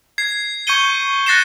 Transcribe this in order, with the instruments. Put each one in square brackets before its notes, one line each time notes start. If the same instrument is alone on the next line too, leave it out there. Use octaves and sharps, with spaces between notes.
[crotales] G#6 C7
C#6 G6 G#6 C#7 D#7 G7
F#6 A6 A#6 C7 C#7 E7